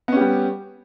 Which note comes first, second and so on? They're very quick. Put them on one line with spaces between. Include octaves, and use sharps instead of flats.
B3 C#4 G4 G3